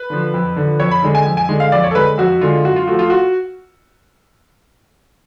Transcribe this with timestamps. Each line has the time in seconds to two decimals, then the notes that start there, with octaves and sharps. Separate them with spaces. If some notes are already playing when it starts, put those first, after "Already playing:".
Already playing: B4
0.10 D3 F3
0.34 F2
0.56 D3 F3
0.80 F2 C#5
0.91 B5
1.03 D3 G#3
1.15 G#5
1.26 F2
1.37 G#5
1.49 D3 G#3
1.60 F5
1.72 F2 D5
1.84 C#5
1.91 A4
1.95 D3 G#3 B4
2.18 F2 F#4
2.41 D3 G#3 F4
2.64 F#2 F#4
2.76 F4
2.87 F3 A3 F#4
2.99 F4
3.10 F#4